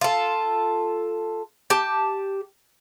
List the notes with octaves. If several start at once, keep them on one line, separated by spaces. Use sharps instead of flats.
F4 A4
G4 A5